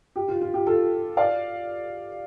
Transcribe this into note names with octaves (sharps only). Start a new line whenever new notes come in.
G4
F4
F4
G4
F4 A4
D5 F5